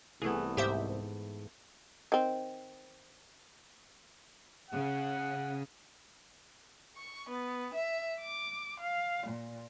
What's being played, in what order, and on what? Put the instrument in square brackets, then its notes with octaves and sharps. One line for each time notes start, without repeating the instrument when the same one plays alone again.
[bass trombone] C2 [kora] E3 A3 B3 [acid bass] G#4
[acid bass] G#2 [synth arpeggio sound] G4 C5 E5
[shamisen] D#3 C4
[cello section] C#3 [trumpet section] F#5
[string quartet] C#6
B3
E5
D6
F5
A#2